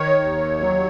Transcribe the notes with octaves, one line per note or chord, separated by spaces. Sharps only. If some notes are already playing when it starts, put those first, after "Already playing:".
Already playing: D#3 C#5
D#2
F#3